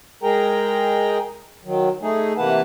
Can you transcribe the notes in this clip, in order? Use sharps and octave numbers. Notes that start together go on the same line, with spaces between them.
G#3 G#4 A#4 G5 A#5
D#3 F#3
A3 D#4 G#4
C3 E3 A#3 B4 F#5 A5